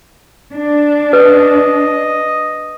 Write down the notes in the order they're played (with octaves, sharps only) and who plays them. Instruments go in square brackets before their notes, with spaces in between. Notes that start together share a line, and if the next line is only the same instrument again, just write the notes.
[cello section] D4
[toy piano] B4 [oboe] D#5